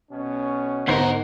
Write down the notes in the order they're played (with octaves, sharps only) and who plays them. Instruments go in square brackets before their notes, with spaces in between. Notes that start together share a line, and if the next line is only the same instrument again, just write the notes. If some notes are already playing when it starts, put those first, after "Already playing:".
[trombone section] B1 B2 C#4
[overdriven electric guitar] D2 A#4 [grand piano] G#2 F#5 C7 [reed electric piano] B3 C5